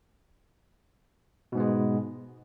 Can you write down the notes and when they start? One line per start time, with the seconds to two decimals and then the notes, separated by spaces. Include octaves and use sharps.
1.52 B2
1.55 G#2
1.57 B3
1.60 G#3